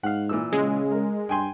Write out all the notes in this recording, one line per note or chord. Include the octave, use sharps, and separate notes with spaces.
G#2 F5 F#5
A#2 E3 E6
C#3 G#3
A#4
G2 G5 G#5 C6